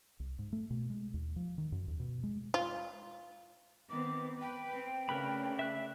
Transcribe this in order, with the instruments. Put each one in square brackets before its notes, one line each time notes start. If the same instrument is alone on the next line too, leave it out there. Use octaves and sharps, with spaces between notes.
[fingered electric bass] C2
G#2
A3
B2
G#3
D#2
F3
D#3
F#2
D#2
B2
G#3
[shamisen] F4
[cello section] D#3 B3 C4 [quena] D6
[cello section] B4 [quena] G5
[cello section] C4
[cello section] C#3 A3 D4 [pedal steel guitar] A#4 B4 B5
[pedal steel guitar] E5 F#6